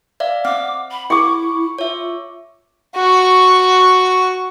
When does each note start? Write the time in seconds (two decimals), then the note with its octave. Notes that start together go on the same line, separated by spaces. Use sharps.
0.20 D5 E5 F5
0.45 C4 F#5 D6 F6
0.91 B5
1.10 E4 C#6 D6
1.79 F4 C#5 E5
2.96 F#4 C#6